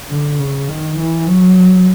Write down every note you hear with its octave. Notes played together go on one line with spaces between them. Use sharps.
D3
C#3
D#3
E3
F#3